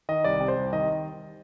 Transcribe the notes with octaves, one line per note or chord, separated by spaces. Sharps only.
D#3 D#5
C2 D5
C3
C5
C2
D#3 D#5